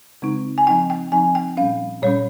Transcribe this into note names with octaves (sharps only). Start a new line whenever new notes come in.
C#3 G#3 C4 D#4
G#5
F3 C4 D#4 G5
G5
F3 C4 D#4 G#5
G5
A#2 G3 C#4 F5
A#2 G3 C#4 C#5